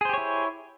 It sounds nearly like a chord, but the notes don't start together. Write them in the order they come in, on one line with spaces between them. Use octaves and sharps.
G#4 C5 G4 C#5 E4